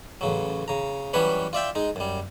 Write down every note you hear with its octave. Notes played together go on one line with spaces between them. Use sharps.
A1 C#3 F#3
C#3 A#5
E3 F#3 G3 C#4 B4 C#5
F4 D5 E5 G5
G#3 D#4
F#2 G3